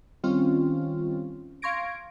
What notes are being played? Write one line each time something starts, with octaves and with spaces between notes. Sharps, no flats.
D#3 G3 C4 C#4 F4
F5 C6 C#6 G#6 A#6 D7